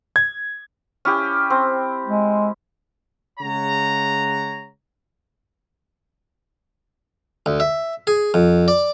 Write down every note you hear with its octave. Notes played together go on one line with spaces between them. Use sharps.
G#6
C#4 E4 G4
C4
G#3
C#3 G#3 C#5 F#5 A#5
D2
E5
G#4
F2
D5